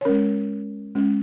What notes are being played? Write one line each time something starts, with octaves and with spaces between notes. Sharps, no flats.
C#5
G#3 C#4 A#4
G#3 C#4